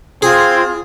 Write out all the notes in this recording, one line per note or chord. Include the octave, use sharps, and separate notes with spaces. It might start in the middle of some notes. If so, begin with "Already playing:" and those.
C4 F4 G#4 G#6